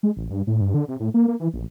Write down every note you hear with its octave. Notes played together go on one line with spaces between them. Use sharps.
G#3
A1
G2
A2
G2
D3
C3
A2
A#3
A#3
E3
A#1